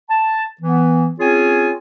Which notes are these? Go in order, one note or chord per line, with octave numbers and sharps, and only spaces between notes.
A5
E3 B3
C4 C#4 F4 G#4 C#5 G#5